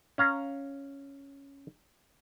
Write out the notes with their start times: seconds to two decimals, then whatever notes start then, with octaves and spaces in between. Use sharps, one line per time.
0.18 C#4 F5 A#5